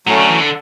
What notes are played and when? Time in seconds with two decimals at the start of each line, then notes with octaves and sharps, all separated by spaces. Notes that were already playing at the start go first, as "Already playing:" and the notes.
0.06 A2 F#3 A3 C#4
0.18 D3
0.29 E3
0.40 D3